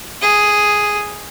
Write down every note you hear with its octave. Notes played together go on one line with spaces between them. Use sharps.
G#4